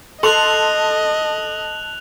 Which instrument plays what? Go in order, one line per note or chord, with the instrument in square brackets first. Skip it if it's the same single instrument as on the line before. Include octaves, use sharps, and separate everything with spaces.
[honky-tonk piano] A4 A5 C6 [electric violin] D#5 [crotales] F#6 F7 F#7